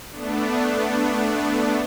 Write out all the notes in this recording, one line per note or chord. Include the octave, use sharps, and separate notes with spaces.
A3 B3 D4